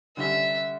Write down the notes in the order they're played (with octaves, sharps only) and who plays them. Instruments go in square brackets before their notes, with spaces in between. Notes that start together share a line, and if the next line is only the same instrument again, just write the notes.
[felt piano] D3 G3 C#4 [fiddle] E5